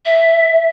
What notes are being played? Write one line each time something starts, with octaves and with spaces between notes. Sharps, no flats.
E5